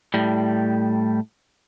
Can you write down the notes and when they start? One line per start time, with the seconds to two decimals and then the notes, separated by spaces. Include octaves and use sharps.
0.14 A2 G3